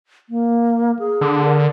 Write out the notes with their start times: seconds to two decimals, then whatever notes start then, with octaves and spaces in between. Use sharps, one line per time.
0.30 A#3
0.99 G#4
1.21 D3
1.44 A#4